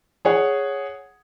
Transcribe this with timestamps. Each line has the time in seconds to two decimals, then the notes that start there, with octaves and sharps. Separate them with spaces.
0.25 G#4 C#5 F#5